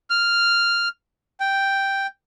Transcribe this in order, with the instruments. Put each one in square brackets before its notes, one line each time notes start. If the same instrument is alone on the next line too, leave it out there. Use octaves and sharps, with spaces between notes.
[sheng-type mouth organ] F6
G5